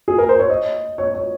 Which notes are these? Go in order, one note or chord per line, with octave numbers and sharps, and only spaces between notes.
G#4
A#4
C5
C#5
D#5
C#5
C#5